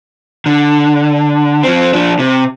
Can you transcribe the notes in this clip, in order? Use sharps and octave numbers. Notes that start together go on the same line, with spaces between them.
D3
F3 C4
F3 D4
C3